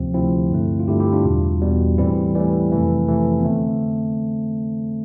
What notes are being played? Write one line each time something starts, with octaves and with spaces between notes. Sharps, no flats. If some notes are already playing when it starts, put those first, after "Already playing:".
Already playing: D2 C3 F3 C4
D2 C3 F3 C4 E4
G2 D3 A3
F4
G2 D3 A3 E4 G4
E4 G4
D4 F4
E2 B2 G3
E2 B2 G3
A2 E3 G3 C4 E4
A2 E3 G3
F2 C3 E3 A3
F2 C3 E3 A3
B3
D3 A3 C4